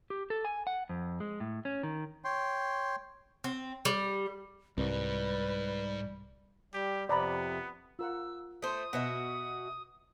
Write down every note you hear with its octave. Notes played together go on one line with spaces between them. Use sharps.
G4
A4
G#5
F#5
F2
G#3
A2
C#4
D#3
C#5 G5 C6
C4
G3
C2 G#2 G3 B4
G3 G4
F2 C3 B3 D5 A#5 B5
F4 A#4 F#5 E6
A3 C5 D#6
B2 F#4 B4 D#5 E5 F#5